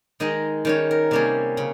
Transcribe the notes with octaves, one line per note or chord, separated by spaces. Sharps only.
D#3 G#3 D#4 D#5
D#3 G3 C#4 C#5
A#4
C3 G3 A#3 C#4 G#4
C#3